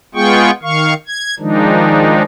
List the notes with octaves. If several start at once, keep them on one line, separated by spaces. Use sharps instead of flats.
G#3 B3 F4 G#4 G5 C#6
D#3 F5 C#6
G#6
D#3 F3 G#3 D4 D#4